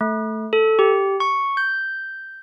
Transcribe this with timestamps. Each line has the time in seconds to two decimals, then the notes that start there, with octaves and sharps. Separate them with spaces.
0.01 A3
0.53 A4
0.79 G4
1.20 C#6
1.57 G6